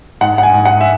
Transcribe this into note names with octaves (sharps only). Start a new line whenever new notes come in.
G#2 F#5
F#5
G#5
G#2
F#5
E5